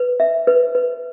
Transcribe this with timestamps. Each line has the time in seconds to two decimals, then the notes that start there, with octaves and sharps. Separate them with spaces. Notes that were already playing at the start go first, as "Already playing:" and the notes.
Already playing: B4
0.20 E5
0.47 B4
0.75 B4